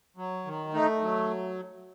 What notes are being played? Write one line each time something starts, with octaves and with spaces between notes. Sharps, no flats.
F#3
D#3
A3 D#4
F#3